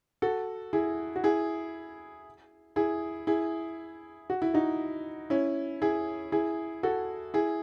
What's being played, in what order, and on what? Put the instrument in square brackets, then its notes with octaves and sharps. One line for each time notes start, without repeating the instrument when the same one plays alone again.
[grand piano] F#4 A4
E4 G#4
F#4
E4 G#4
E4 G#4
E4 G#4
F#4
E4
D#4 F#4
C#4 E4
E4 G#4
E4 G#4
F#4 A4
E4 G#4